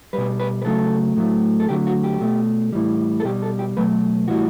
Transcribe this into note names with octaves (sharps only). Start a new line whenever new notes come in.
B2 G3 B4
B4
B4
C#3 F#3 A3 A4
A2 F#3 A3
A4
D3 F#3 A3 G4
F#4
G4
B2 A3
A2 E3 G3
A4
B2 G3 G4
A4
G4
B2 F#3 A3 B4
A2 E3 G3 F#4